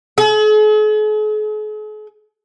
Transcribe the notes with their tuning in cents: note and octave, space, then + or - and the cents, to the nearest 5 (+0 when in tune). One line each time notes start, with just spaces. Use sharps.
G#4 +45